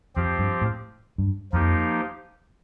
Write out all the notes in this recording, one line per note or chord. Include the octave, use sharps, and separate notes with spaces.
F2 F3 C4 G4
G2
A2
G2
F2 F3 A#3 D#4 G4